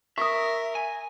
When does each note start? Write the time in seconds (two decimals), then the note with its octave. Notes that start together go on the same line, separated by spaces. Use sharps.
0.18 A#4 E5 C#6 D#6
0.75 G#5